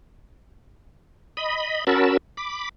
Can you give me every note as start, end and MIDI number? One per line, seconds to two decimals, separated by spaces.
1.37 1.84 75
1.37 1.84 83
1.87 2.17 61
1.87 2.17 66
1.87 2.17 70
1.87 2.17 81
1.87 2.17 83
1.87 2.17 88
2.37 2.69 83
2.37 2.69 86